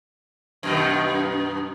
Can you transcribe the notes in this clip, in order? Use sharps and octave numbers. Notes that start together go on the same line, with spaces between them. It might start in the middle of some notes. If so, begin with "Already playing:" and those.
F#2 B2 D#3